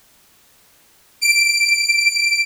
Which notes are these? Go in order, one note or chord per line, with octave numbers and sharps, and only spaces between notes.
D7